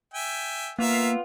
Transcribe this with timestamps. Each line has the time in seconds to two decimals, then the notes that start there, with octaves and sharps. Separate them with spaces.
0.14 E5 G5 G#5
0.79 A#3 B3 F4 A#4 E5 F5